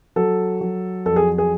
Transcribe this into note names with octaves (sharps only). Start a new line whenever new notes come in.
F#3 A4
F#3
F2 A4
G#4
G#4